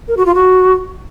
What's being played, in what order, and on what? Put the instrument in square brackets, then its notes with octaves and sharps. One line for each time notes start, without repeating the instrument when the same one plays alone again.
[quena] A#4
F#4
F4
F#4